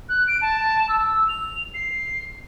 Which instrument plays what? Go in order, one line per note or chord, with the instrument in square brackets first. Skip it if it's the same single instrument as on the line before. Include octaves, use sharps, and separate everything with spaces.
[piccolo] F#6
D7
A5
E6
F7
C7